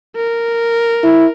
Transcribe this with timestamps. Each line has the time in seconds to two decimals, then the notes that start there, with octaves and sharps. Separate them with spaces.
0.17 A#4
1.04 E4